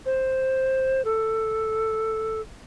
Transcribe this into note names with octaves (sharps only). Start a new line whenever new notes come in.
C5
A4